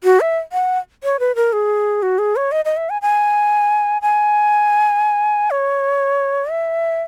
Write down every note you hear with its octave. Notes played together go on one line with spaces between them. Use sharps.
F#4
E5
F#5
C#5
B4
A#4
G#4
F#4
G#4
C#5
D#5
D#5
E5
G#5
G#5
G#5
C#5
E5